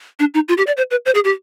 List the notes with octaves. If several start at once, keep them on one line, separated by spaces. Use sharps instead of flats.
D4
D#4
F4
G4
D5
C5
B4
C5
G#4
G4